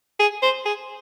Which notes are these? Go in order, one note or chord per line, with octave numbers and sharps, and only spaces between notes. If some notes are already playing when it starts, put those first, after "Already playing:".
G#4
C5
G#4